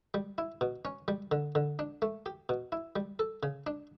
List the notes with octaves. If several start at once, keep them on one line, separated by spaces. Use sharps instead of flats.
G3
E4
B2
C#4
G3
D3
D3
D4
A3
G4
B2
E4
G3
A4
C#3
D4